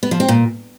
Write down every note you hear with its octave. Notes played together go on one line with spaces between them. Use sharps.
B3
F3
C4
A#2